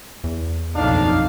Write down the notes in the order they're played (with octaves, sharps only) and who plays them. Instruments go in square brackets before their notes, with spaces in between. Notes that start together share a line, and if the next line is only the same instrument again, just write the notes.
[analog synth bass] E2
[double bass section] F#1 B1 F2 [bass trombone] D4 [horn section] D#4 F5